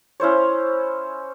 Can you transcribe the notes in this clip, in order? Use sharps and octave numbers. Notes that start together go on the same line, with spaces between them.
C#4 E4 C5 C#5